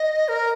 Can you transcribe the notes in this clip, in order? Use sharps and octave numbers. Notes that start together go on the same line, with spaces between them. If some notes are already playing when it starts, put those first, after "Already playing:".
Already playing: D#5
A#4